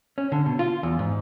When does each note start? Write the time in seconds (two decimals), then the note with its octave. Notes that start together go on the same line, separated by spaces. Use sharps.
0.18 C#4
0.32 D3
0.46 B2
0.59 F4
0.83 E2
0.99 G#2